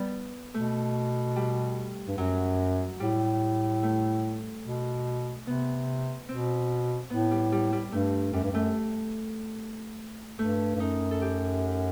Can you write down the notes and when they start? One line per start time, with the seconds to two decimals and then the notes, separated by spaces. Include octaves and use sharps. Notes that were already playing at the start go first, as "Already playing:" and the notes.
Already playing: G3 B3
0.54 B2 A3
1.36 G3
2.08 G2
2.18 F#2 F#3
3.00 A2 G3
3.83 A3
4.64 B2
5.46 C3 B3
6.29 B2 C4
7.10 A2 B3
7.31 G3
7.52 G3
7.73 G3
7.92 G2 A3
8.33 F#2 G3
8.43 G2
8.52 F#2 A3
10.39 G2 A3
10.76 G2
10.80 F#2 D#4
11.11 A4
11.21 G4